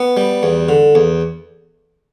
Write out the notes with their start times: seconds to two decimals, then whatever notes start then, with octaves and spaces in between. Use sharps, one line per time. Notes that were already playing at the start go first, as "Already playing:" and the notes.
Already playing: B3
0.17 G3
0.43 E2
0.69 D3
0.95 E2